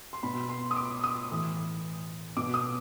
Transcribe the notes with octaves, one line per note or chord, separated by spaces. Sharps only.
C6
B2 B5
C6
D#6
D6
D#6
A2 E3
B2 D6
D#6